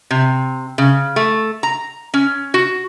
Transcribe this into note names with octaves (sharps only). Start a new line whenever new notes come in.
C3
C#3
A3
A#5
C#4
F#4